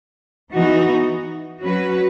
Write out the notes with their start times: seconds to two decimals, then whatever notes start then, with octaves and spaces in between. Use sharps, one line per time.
0.52 E3 B3 D#4 F#4
1.61 F#3 C#4 F#4 B4